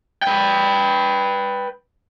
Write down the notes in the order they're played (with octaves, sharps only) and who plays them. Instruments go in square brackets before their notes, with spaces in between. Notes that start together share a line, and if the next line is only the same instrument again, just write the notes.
[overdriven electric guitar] B4 G5